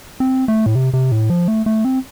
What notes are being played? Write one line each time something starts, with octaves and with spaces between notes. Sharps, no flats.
C4
A3
A2
C3
C3
A2
F3
A3
A3
C4